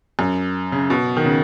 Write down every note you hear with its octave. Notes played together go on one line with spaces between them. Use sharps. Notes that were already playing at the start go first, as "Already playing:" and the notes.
F#2
C#3
B2
D#3
C#3